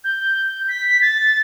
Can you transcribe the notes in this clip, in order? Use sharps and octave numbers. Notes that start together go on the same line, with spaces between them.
G6
B6
A6